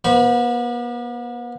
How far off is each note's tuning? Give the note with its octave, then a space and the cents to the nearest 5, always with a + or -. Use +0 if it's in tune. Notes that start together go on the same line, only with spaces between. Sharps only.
B3 -45 C5 -25 B5 -25